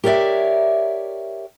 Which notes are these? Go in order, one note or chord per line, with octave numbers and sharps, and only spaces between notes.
G4 A#4 C#5 D5 E5